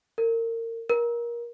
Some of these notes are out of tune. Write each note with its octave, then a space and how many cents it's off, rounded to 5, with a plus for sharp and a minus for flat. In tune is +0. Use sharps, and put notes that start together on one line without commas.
A#4 -30
A#4 +20